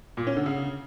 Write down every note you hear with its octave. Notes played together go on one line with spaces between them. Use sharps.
A#2
C#4
D3
C#3